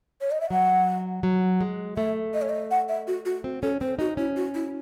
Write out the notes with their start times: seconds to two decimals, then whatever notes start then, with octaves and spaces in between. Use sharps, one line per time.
0.21 C#5
0.31 D#5
0.41 E5
0.50 F#3 F#5
1.23 F#3
1.61 G#3
1.97 A3 E5
2.34 D#5
2.42 C#5
2.49 D#5
2.71 F#5
2.88 E5
3.07 F#4
3.25 F#4
3.44 C4
3.62 C#4 A4
3.81 C4 C5
3.99 D#4 F#4
4.17 C#4 E4
4.36 F#4
4.54 E4